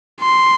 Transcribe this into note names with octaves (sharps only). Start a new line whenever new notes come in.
C6